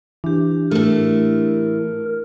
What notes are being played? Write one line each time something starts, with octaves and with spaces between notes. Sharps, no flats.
E3 D4 G4
A2 A3 A#4